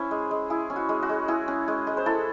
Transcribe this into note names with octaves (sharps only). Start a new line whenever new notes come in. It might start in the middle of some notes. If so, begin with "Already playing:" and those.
Already playing: C#4 E4 C5
G#3
G#3
E4 G#4
C#4
F#4
G#3
F#4
G#3
E4 G#4
C#4
G#3
G#3
C5
E4 A4